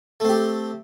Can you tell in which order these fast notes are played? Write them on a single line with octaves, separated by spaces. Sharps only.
A3 C4 G4